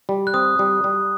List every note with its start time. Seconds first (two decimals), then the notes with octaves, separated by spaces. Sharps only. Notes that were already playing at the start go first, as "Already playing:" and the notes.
0.09 G3
0.27 F#6
0.34 C4 D#6
0.59 G3
0.84 G3